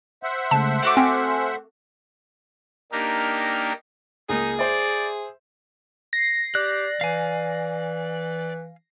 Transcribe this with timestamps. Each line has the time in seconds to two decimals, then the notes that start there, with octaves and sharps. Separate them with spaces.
0.23 C5 E5 F#5
0.51 C#3 G#3 A3 A5
0.82 A3 F#4 D6
0.97 C4 G#5 C6 F6
2.92 A#3 D4 D#4 G4 A#4
4.29 C#2 G#3 A#3 D#4 G#4
4.59 C5 D5 E5
6.13 A#6 C7
6.55 G4 D5 F#6
7.01 E3 F5 G#5